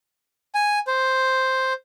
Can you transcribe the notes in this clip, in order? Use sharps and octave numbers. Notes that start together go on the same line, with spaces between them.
G#5
C5